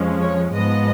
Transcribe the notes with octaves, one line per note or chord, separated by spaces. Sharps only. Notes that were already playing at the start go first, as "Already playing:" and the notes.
Already playing: F2 F3 G#3 C#4
C#5
G#2 F3 B3 D#5